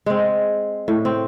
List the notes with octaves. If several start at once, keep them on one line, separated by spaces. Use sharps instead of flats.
G#3 C4
A2
C4